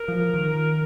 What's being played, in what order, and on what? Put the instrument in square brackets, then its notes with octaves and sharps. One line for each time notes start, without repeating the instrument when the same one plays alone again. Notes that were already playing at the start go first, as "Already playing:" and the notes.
Already playing: [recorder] A#4
[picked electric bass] F3
D#3